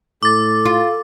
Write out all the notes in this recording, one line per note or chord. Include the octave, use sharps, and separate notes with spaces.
A2 A4 D6 A6
F4